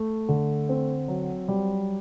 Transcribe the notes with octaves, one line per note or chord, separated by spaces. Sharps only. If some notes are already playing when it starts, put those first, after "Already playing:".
Already playing: A3
D3
C4
F#3
G3